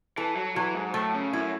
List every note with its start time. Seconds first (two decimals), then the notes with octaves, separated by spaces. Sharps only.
0.17 E3 A4
0.36 F#3
0.56 E3 F#3
0.75 G#2
0.94 A2 A3
1.14 C#3
1.33 F#2 E4